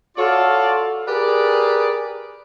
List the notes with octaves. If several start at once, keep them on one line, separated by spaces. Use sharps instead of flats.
F4 F#4 A4 C#5 D5 F5
G4 G#4 A#4 B4 D5